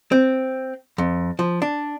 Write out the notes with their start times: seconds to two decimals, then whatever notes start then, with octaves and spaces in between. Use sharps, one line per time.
0.12 C4
0.98 F2
1.39 F3
1.62 D4